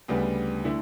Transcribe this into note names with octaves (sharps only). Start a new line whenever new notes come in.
D2 C#3 G3 B3
D3 A3 E4